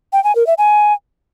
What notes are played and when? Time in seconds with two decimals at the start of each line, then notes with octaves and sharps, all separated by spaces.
0.13 G5
0.24 G#5
0.35 A#4
0.47 E5
0.58 G#5